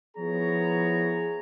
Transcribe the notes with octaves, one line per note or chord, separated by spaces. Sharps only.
F3 B3 E4 G#4 C#5 A#5